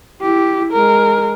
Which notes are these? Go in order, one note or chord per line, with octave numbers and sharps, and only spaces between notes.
E4 G4
G#3 A#4